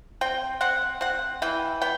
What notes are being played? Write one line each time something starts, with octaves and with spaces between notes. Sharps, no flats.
C4 G5
C4 F#5
C4 F#5
E3 G5
B3 G5